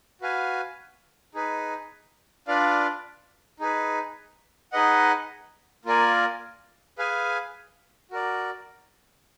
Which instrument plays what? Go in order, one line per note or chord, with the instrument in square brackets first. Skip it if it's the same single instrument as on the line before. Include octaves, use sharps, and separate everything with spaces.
[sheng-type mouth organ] F#4 B4 F5 G#5
D#4 G#4 B4
D4 F4 B4 D5 F5
D#4 G#4 B4
D#4 G#4 B4 D#5 F#5
A#3 F4 A#4 D5 G#5
G#4 B4 F5 G#5
F#4 A#4 D5